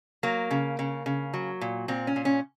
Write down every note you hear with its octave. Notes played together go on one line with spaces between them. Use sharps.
F#3 A#3
C#3
C#3
C#3
F#3
A#2
A#2 C4
C#4
A#2
C#4